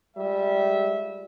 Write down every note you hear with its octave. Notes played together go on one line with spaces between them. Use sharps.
G3 G#3 F4 E5